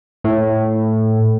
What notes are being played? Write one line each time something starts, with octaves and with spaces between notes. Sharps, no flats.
A2